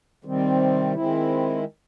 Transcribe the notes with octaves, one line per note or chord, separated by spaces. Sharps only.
C3 D#3 G3 C4
D#3 G#3 C4 E4